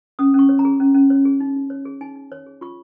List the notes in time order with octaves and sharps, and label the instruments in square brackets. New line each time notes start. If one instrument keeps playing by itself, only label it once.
[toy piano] C#4 D#6
C#4
C#6
C#5
A#5
G#4
C#4
C#4
C#5
G#4
D#4
D#4
C#5
G#4
D#4 G#5
D#4
C#5
G#4
F4 C#6